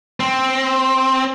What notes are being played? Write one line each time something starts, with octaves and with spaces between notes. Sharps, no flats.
C4